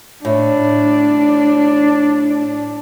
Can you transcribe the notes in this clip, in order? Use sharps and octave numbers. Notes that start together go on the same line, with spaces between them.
A2 D4